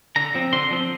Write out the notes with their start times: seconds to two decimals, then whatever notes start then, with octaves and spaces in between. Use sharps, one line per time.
0.16 D3 A#5
0.34 F3 C4
0.53 D3 C6
0.71 F3 C4